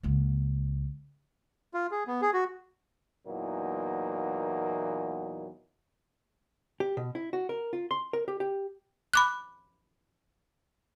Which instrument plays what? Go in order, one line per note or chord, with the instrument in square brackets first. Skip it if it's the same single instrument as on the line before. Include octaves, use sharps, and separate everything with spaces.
[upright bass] C#2 A#3
[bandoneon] F4
G#4
B3
G#4
F#4
[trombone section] E2 A#2 E3 F#3 A#3 D#4
[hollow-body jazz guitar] G4
B2
E4
F#4
A#4
F4
C6
A#4
G4
G4
[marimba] B5 D6 F#6